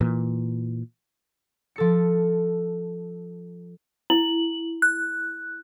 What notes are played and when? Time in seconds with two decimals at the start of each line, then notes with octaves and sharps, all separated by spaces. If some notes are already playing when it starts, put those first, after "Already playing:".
0.01 A#2 E3
1.76 F3 A4 C#7
4.10 E4 F#7
4.82 F#6